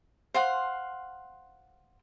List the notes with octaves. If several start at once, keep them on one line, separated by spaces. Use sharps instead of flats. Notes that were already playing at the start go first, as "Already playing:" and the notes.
C5 F5 F#5 C6